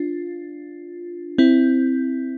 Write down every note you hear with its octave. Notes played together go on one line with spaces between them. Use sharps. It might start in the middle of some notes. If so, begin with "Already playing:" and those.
Already playing: D4 F4
C4 E4